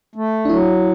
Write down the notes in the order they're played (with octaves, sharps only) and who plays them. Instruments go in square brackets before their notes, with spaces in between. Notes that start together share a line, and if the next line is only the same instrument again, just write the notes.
[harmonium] A3
[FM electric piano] D4
[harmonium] F#3 [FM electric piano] E4